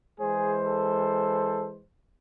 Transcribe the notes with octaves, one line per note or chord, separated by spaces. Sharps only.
E3 G#3 G#4 C5
A4